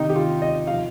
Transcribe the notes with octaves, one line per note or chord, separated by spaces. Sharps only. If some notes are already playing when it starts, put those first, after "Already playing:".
Already playing: C3 D#3 D#4
G4
F4
D#5
C3 F3 F5